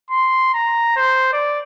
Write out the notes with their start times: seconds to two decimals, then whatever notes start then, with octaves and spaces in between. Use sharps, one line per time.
0.10 C6
0.54 A#5
0.96 C5
1.33 D5